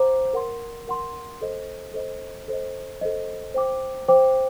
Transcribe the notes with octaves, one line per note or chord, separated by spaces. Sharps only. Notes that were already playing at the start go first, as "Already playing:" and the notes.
Already playing: C5 F#5 A#5 D6
A#4 F#5 C6
A#4 F#5 C6
A4 C5 D#5
A4 C5 D#5
A4 C5 D#5
A4 C5 D#5
C5 G5 D6
C5 G5 D6